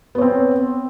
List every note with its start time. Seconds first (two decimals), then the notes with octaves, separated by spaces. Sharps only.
0.15 B3
0.18 C#5
0.22 C4